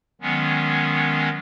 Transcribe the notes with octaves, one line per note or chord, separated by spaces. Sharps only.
D#3 F#3 G#3 B3 C#4